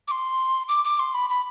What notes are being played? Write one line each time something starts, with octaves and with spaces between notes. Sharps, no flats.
D6
C6
D6
D6
C6
B5
B5